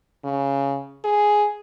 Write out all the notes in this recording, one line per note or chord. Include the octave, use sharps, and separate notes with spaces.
C#3
G#4